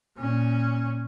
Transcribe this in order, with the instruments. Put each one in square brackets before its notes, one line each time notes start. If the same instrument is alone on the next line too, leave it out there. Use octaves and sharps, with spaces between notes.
[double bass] A#2 C#4